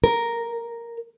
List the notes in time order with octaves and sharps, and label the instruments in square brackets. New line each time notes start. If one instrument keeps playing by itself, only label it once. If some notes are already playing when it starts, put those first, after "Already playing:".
[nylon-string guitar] A#4